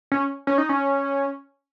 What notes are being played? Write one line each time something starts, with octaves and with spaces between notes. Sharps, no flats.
C#4
C#4
D#4
C#4